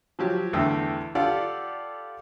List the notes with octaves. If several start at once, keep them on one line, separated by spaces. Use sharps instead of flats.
F3 F#3 G4
E2 D3 A3 E4 G5 D#6
F4 G4 A4 D5 F5 F#5